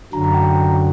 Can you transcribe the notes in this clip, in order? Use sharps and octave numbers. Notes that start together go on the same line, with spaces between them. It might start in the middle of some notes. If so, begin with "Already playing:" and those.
F#2 D3 F#3 A#5
A#5
G5